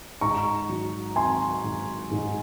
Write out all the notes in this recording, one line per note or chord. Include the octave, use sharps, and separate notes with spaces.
G#2 A#5 C#6
F#3
C4 G#5 C6
G#2
G#2